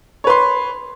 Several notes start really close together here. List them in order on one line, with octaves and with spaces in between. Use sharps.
C#5 B4 C6